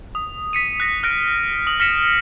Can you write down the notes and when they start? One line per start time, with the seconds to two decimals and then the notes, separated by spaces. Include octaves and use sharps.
0.15 D#6
0.53 B6 C#7 D#7
0.80 F#6 A#6
1.03 F6 F#6 A#6 D7
1.67 D#6 F#7
1.80 F6 A#6 B6 C#7 E7